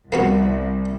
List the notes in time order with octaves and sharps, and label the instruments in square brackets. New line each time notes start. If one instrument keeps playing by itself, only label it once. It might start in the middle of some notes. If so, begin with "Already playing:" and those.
[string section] C2 [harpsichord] A#3 B3 F#4